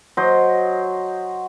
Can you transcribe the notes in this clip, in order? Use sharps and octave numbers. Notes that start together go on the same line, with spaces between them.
F#3 C5 D#5